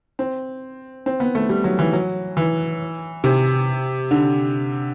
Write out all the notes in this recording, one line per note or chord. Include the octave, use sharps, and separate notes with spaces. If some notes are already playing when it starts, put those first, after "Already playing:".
C4
C4
B3
A3
G3
F#3
E3
F#3
E3
C3
D3